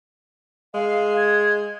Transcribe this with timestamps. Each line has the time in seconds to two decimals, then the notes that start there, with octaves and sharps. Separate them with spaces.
0.75 G#3 F5
1.17 G#6